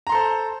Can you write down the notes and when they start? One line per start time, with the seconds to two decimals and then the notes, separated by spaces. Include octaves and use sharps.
0.07 A#5
0.09 C6
0.12 A4
0.15 C5